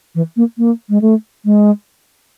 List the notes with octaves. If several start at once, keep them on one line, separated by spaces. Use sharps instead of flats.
E3
A#3
A#3
G#3
A3
G#3